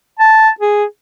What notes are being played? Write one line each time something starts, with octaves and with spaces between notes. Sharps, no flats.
A5
G#4